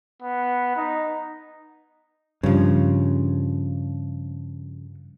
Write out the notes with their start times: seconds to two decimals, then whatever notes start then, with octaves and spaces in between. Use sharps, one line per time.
0.23 B3
0.76 D#4
2.43 G2 C#3 F3